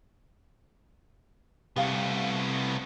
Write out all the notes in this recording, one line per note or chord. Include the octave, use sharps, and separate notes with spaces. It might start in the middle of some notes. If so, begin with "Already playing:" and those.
C2 A3 B3 G4 F5 F#5